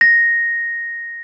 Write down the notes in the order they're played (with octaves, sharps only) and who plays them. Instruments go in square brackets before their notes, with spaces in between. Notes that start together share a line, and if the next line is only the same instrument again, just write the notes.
[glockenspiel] A#6